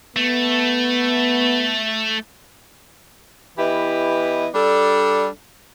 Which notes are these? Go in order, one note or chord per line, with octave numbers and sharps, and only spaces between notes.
A3 B3
E3 B3 E4 G4 D#5
G3 D4 A4